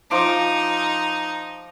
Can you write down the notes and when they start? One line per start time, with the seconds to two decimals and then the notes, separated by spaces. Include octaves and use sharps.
0.11 F3 D#4 D6